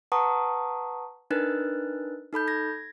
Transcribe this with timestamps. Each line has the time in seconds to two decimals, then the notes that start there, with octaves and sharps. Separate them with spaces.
0.12 B4 F#5 A5 A#5 C#6 D#6
1.31 D4 D#4 A#4 B4 F#6 A6
2.33 D#4 A4 B5 G6
2.47 G#6 A#6